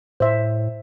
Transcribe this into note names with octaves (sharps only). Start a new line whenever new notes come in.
A2 C5 E5